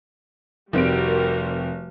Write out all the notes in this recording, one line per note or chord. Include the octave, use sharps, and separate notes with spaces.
F1 G3 C4 F#4 A#4 D7